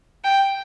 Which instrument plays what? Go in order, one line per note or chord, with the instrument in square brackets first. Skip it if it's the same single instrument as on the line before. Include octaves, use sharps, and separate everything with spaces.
[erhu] G5